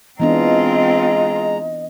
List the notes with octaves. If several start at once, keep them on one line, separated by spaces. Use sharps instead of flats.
E3 G#3 B3 C4 D4 F4 D#5 A#5